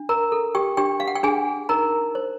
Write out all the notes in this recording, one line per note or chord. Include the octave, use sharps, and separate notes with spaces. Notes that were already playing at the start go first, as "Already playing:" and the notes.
Already playing: D4
A#4 A#5
A4
G4 G5
D4 G4 G5
F5
F#5
G5
D4 G#4 G#5
D#4 A#4 A#5
C5